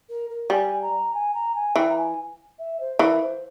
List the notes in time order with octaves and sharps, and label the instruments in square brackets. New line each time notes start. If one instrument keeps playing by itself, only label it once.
[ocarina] A#4
A#4
[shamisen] G3 [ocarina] G#5
[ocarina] A#5
G#5
A#5
G#5
[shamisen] E3 [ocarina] G5
[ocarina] A#5
G#5
E5
C5
[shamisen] E3 [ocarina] A#4
[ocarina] C5